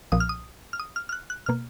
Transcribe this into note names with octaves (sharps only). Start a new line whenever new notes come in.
B1 A#2 F3 D#6
F6
D#6
F6
D#6
F6
F6
F#6
F#6
B2 A#3 F6